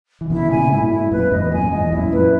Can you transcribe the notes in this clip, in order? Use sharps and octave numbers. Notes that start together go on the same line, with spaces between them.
E3
B2 D#3 E4
D#3
A#2 C#3 G#5
G#2 B2 E4
E4
F#2 A#2 B4
E2 G#2 D#5
F#2 A#2 G#5
E2 G#2 D#5
F#2 A#2 E4
F#2 A#2 B4